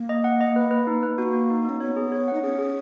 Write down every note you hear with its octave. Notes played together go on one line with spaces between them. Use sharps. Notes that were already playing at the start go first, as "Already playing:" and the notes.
Already playing: A#3
D#5
F#5
D#5
B4
B4
D#4
B4
A#3 B3 F#4
F#4
D#4
C#4 D#4
B3 C#5
G#4
C#5
F#5
D#4
C#4 G#4
G#4